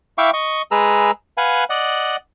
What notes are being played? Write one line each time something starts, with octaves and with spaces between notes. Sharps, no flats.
E4 E5 F5 G5 C#6 D6
D#5 C#6
G#3 G#4 B4 A#5 E6
B4 F5 F#5 G#5
D5 D#5 F#5